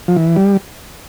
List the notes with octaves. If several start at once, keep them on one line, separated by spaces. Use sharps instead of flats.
F3
E3
G3